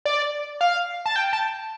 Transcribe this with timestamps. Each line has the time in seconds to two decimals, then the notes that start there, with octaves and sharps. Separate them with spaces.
0.05 D5
0.61 F5
1.06 A5
1.16 G5
1.33 A5